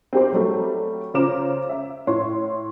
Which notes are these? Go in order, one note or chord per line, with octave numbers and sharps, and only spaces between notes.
C4 D#4 G4 A#4 C5
F#3 G3 A3
C#3 F4 C5 A#5 D6 E7
E5
A2 C#5 C6